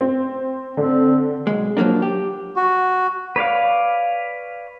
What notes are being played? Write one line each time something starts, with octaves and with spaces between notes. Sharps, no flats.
C4
D3 C4
B1 F2 G#3
F3 F#3 G#3 A#3 D4
G4
F#4
B4 C#5 D5 F5